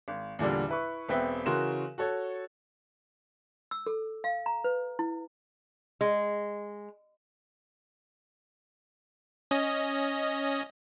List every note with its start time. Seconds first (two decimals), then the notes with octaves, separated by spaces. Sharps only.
0.08 G#1
0.39 E2 A#2 D3 G3
0.68 E4 B4 C#6
1.09 E1 B3 C4 B4 E5 G5
1.46 C#3 E3 F#4 A#4 C6 E7
1.98 F#4 A4 C#5
3.71 E6
3.87 A4
4.24 F5
4.46 A#5
4.64 B4
4.99 E4
6.01 G#3
9.51 C#4 D#5